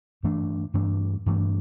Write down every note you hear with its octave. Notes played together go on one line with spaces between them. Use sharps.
G2 E3 A3 D4
G2 E3 A3 D4
G2 E3 A3 D4